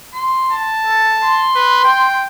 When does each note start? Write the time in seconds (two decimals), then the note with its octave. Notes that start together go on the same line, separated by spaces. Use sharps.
0.13 C6
0.53 A5
0.86 A4
1.22 C6
1.55 B4
1.85 G5